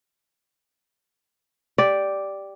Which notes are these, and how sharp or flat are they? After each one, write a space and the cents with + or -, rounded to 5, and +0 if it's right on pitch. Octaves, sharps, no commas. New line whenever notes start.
G4 +0 D5 +0